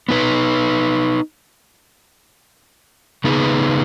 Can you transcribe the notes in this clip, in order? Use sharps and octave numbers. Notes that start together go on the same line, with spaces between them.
B3 D#4 B4
C#3 B3 D#4 G#4 B4